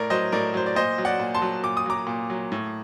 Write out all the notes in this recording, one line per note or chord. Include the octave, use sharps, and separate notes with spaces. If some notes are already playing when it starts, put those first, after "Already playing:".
Already playing: A2 A#4 D5
F#3 C5 D#5
A2 A#4 D5
F#3 C5
D5
A#2 C5 D#5
F#3
D5 F#5
A#2
A5 C6
F#3
A#2 D6
D#6
F#3 A#5 D6
A#2
F#3
A2